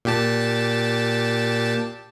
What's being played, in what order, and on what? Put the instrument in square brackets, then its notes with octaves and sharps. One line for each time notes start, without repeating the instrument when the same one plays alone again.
[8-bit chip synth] A#2 G4 A5